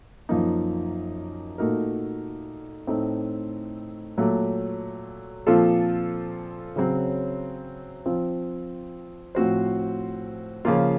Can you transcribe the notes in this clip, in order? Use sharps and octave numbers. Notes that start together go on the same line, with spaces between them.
F#2 F3 A#3 D#4
A#2 A3 D#4 F#4 A#4
A2 A3 C4 D#4
A#2 F#3 A3
A#2 F3 C4 F4 A4
C#3 F#3 C4
F3 C4 F4
A2 F3 C4 F#4 C5
C#3 F3 A#3 F4